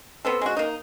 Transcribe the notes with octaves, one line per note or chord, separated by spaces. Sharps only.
B3 C4 A4
G#3 F#4
A#3 D#4